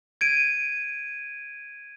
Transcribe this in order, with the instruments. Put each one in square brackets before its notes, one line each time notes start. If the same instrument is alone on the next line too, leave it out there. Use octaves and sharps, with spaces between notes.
[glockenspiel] G#6 D7 D#7